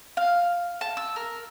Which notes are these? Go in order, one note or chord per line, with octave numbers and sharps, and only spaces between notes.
F5
A5
E6
A#4